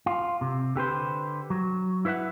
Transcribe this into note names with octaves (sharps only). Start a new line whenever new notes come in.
F4
C3
D3 G4 B4 C5
F#3
E4 B4 C#5 E5 F#5